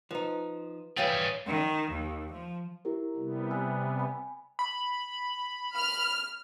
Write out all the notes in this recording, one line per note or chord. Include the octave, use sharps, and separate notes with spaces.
F3 D#4 B4
E3 G3 G#4 B4 C#5 F5 G5 A6
D#3
D#2
F3
E4 G4 A#4
C3 G3 B3
G#5 E6 F#6
G5 G#5 B5
B5
F6